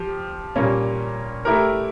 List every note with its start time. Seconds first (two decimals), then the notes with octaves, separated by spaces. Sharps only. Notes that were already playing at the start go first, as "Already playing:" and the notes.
Already playing: F3 G4
0.56 A#2 G3 A#3 C#4
1.45 A3 E4 G4 A#4